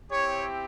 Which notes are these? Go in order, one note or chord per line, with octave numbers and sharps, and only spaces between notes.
C4 E4 G4 C#5